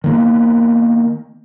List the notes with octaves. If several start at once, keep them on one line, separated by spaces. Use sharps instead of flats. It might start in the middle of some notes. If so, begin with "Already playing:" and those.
D#3 A#3 B3